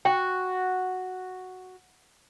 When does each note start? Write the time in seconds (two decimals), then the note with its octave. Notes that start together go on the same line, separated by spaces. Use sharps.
0.05 F#4 G5